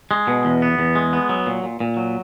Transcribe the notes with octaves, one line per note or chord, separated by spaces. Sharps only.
G#3
B2
E2
B3
E2
G#3
B3
F#3
A#2
A#2
A#2
F#3